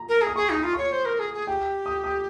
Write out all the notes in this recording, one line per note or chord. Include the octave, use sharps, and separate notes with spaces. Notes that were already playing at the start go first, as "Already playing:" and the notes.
Already playing: A#5
A#4
G#4
D#6
G#4 C#6
D#4 D#6
F4
C#5 C#6
C5
A#4
G#4
G#4
G4 G5
D#6
D#6